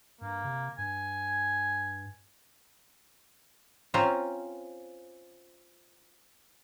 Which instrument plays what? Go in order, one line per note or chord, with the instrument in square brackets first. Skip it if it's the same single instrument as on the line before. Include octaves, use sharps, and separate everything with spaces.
[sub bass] G2 [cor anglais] A#3
[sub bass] C3
[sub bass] G2 [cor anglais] G#5
[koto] C4 C#4 F4 C5 A#5